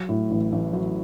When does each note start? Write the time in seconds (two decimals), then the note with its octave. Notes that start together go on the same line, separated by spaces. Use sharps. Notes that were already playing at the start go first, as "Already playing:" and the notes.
Already playing: F#3
0.09 A2
0.31 A1
0.52 A1
0.73 F#3